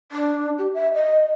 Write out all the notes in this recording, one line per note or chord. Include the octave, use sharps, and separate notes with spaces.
D4
G4
E5
D#5